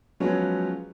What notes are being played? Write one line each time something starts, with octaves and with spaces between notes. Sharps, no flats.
F3 F#3 G#3 B3 C#4 F4